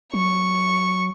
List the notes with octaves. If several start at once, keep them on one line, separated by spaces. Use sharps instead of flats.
F#3 C#6